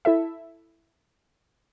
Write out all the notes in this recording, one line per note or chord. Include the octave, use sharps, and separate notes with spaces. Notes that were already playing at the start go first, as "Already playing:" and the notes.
E4 A4 E5